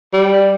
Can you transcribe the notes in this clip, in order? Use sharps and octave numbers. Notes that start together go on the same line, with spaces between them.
G3